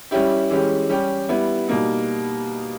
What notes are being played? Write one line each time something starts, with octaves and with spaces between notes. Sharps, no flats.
G3 C#4 E4 G4
E3 G#3 C#4 G4
G3 C#4 G4
G3 B3 E4
B2 G3 A#3 D#4